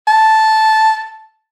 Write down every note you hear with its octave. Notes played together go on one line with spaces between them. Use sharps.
A5